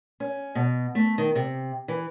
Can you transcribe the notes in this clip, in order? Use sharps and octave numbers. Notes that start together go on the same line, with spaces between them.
C#4
B2
A3
D#3
C3
E3